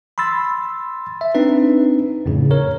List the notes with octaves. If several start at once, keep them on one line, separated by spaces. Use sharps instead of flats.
B5 C6 E6 A6
E5
C4 D4 D#4 B4
F2 A2 C#3
A#4 C#5